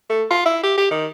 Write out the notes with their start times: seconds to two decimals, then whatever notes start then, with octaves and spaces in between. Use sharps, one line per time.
0.10 A3
0.31 F4
0.46 E4
0.64 G4
0.78 G4
0.91 D#3